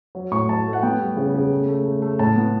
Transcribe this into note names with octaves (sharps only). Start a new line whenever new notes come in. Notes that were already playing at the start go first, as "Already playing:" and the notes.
F#3
A2 C#6
F#3 A5
A3
F#5
B3 G5
G3
C#3
C#3
A3
A3
A3
A3
A2 A5
B3